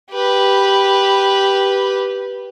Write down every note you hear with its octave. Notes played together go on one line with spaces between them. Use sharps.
G4 B4